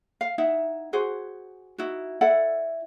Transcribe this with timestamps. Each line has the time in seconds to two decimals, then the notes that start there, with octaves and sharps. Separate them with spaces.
0.21 F5
0.38 D#4 E4 E5 F#5
0.93 F#4 G#4 C5 F#5
1.78 D#4 E4 F#4
2.21 E4 A4 D5 F#5